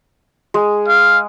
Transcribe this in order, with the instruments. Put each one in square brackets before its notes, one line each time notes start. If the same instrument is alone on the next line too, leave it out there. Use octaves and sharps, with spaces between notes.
[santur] G#3
[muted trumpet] F5